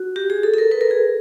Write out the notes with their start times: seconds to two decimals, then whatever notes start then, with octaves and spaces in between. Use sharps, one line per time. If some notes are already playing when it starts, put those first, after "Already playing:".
Already playing: F#4
0.16 G4
0.30 G#4
0.43 A4
0.54 A4
0.58 A#4
0.71 B4
0.81 A#4
0.91 G#4